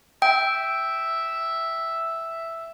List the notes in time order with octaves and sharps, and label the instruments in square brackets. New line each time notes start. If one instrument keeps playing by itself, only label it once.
[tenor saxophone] E5 [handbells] G5